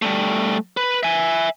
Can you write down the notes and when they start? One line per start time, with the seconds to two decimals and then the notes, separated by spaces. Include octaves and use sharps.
0.02 G3 A3
0.77 B4
1.03 E5 G#5